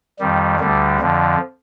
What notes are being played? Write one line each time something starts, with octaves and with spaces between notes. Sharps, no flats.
F2 D#3 G3
D2 D3 G3
F2 D3 F3